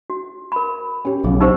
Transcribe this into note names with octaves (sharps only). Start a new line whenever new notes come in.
F#4
A#4 B5
C#4 G4
B1 C#3 F3 G#4
B2 D#4 G4 C5 E6